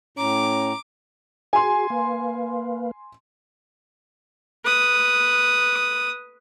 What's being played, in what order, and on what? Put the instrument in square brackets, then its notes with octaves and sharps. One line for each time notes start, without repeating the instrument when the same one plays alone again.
[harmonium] A2 [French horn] C#4 [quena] A#5 [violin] D6
[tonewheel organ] F#4 G#4 [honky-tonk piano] G#5 C6
[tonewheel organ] A#3 B4 F5
[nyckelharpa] B4 D#6